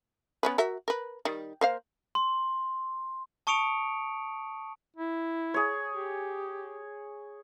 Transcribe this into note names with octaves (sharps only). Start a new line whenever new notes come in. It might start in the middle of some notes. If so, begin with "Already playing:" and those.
B3 C#4 B4
F#4 A#4 E5
A#4 B4
D#3 G3
A#3 C5 F5
C6
A5 C#6 D#6 C#7 D7 F7
E4
G#4 C#5
G4